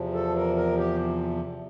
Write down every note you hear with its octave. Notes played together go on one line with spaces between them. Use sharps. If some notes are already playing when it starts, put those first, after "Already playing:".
Already playing: E2 C3 F3
A4
A#4
A#4
G4